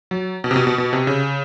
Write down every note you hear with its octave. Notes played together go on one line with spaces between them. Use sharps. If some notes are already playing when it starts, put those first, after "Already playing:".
F#3
B2
C3
B2
B2
B2
C3
C#3